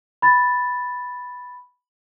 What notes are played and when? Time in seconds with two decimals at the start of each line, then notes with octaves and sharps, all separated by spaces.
0.22 B5 A6